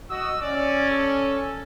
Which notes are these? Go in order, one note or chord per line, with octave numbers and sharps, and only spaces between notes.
F#4 D#5 E6
C#4 D5
A4